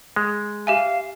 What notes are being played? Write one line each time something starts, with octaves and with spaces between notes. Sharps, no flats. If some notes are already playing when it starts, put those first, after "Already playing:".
G#3
G4 E5 F5 G#5